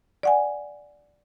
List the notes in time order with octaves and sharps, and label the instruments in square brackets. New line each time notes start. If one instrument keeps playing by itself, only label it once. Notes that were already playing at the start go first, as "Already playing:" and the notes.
[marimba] D5 F#5 G#5